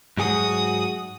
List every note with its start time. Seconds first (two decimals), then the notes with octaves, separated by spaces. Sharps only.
0.18 G#2 F#3 F#4 G#4 D#6